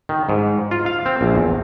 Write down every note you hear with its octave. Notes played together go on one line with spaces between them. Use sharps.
D#3
G#2
F4
F5
C4
A#1
E2